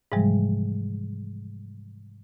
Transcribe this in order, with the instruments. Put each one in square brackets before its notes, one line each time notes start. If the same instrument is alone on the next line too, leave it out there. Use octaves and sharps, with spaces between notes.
[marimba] G#2 C3 E3 F3 G3 G#3